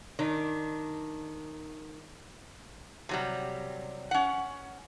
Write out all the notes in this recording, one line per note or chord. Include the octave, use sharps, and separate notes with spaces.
D#3 D4
C3 F#3 G3
C#4 F#5